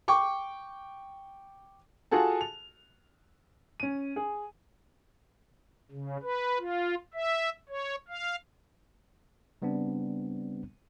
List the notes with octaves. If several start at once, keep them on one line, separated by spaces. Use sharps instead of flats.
G5 C#6 D6
F4 F#4 G#4 A4 A5
F7
C#4 D#7
G#4
C#3
B4
F4
E5
C#5
F5
C#3 G3 B3 C4 D4